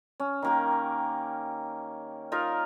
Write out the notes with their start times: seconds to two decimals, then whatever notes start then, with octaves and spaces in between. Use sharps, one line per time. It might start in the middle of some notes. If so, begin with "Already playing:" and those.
0.20 C#4
0.42 D#3 A#3 G4
2.32 D#4 F4 A#4 F5